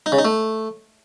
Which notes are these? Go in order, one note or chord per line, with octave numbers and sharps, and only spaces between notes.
D#4
C#3
D#4
A3